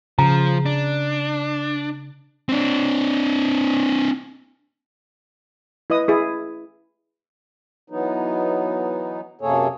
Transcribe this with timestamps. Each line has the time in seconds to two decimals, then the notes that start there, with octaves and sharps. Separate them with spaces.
0.19 C#3 F3 A#5
0.66 D4
2.49 C4 D4
5.90 E4 B4 D#5 D#6
6.08 E4 G#4
7.90 E3 F#3 B3 D#4
9.41 F#2 C3 A#3 G#4 A4 C#5